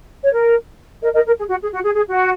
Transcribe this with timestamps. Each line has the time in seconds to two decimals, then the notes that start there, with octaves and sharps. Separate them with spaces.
0.22 C#5
0.32 A#4
1.02 A#4 D#5
1.14 A#4 D#5
1.26 A#4
1.37 G#4
1.49 F#4
1.62 G#4
1.73 F#4
1.84 G#4
1.96 G#4
2.08 F#4